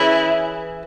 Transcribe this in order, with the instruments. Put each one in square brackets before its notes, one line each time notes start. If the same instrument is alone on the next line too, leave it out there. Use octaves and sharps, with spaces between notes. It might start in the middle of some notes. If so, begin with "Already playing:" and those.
Already playing: [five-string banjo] E3 C#4 G#4 C#5 [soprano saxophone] E4